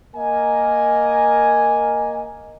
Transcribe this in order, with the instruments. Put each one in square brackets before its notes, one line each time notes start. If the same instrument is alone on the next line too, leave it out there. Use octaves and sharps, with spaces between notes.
[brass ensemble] A#3 A#4 D#5 G#5